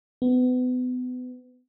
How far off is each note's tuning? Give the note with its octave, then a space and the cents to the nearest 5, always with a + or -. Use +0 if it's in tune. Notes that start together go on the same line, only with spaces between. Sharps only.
B3 +30